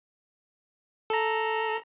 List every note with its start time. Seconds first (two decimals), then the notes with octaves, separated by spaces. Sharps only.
1.10 A4 A#5